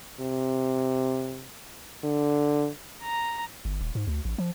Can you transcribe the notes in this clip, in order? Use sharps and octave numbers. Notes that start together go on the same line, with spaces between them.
C3
D3
A#5
G1
D#1
G#2
D2
A1
F3